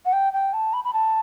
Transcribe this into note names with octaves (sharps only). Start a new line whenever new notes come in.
F#5
G5
G5
A5
B5
B5
A5